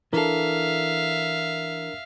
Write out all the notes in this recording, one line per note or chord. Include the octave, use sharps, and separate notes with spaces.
E3 D4 A4 A#4 E5 F5